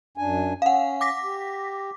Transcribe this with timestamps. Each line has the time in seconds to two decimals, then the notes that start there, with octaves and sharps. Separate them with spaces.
0.18 F#2 D4 G#5
0.62 C#4 F5 F#5
1.01 D6 A#6 B6
1.24 G4